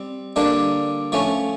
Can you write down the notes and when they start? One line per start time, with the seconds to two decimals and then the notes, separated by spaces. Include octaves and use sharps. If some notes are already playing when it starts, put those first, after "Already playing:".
Already playing: G3 C4
0.36 D3 G3 A#3 D4
1.12 F3 A3 C#4